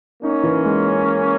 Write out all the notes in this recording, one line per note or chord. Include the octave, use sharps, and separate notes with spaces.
A#3 C#4 D#4
E3
G#3